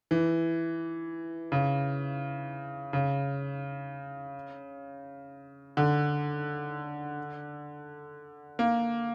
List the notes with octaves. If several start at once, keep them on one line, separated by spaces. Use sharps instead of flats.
E3
C#3
C#3
D3
A#3